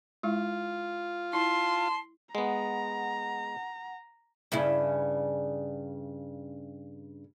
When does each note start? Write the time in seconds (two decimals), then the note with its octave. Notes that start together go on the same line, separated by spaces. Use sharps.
0.23 G#3 E4 F4
1.33 E4 A5 C6
2.35 G#3 B3 F#5 A#5
4.52 G2 C#3 E4